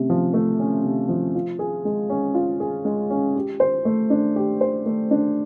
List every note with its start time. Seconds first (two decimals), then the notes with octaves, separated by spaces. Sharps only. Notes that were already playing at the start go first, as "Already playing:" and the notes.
Already playing: C3 A3 C#4
0.10 F3
0.34 A3
0.59 C#4
0.84 C3
1.09 F3
1.35 F4
1.59 G#4
1.85 G#3
2.10 C#4
2.34 F4
2.60 G#4
2.85 G#3
3.10 C#4
3.36 G4
3.60 C5
3.85 A3
4.10 D4
4.36 G4
4.61 C5
4.86 A3
5.11 D4